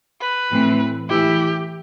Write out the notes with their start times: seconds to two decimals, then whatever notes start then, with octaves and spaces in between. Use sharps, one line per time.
0.21 B4
0.51 A2 E3 A3 C4
1.09 E3 A3 E4 G4